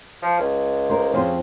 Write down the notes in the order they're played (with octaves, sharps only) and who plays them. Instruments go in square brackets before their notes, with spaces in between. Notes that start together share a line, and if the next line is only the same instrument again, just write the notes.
[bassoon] F3
C#2
[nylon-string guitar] A#4 C5
[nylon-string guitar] F2 C5 [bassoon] C#3